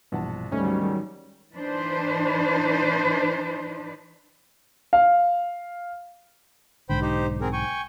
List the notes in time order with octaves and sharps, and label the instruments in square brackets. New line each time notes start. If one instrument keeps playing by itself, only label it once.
[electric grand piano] A#1 F#5 A5 [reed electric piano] G2 B2 E3
[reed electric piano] D2 A3 [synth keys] G#2 C#4 [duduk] G3
[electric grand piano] D#3 F#3
D#3 F#3
[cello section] E3 D4 D#4 B4 C5
[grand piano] F5
[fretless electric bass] B1 G#2 D3 [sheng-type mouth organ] C5 G5 B5
[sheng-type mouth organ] D#4 G4 C5
C4 G#4 A#4
G5 G#5 C#6